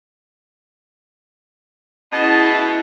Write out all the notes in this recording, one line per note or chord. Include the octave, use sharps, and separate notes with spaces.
B2 C#4 E4 G#4 D#5 F#5 A5